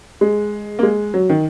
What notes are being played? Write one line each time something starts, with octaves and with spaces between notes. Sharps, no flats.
G#3
A#3
G#3
F#3
D#3